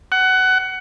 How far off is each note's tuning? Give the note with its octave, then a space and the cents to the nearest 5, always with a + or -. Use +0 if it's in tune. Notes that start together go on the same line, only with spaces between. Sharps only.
F#5 +20